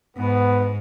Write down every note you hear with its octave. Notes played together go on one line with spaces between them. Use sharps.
G#2 B3